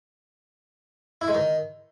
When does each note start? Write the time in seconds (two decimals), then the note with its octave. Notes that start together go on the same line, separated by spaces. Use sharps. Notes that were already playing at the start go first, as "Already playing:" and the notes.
1.21 E4
1.28 G#3
1.34 D#3